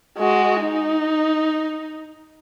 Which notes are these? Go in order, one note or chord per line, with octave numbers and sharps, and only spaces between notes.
G#3 F#4
D#4